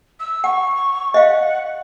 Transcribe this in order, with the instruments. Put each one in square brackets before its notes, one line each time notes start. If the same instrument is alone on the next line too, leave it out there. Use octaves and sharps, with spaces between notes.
[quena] E6
[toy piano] F#5 [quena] C#6
[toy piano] D#5 F5 [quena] F#5